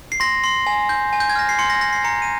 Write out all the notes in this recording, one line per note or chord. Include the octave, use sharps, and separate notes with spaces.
C7
C6 A#6
C6 C7
G#5
G6
G#5
G6
G#6
F6 A#6
C7
C6 C#7
A#6
C6 A#6
C7
A#5 C#7
D#7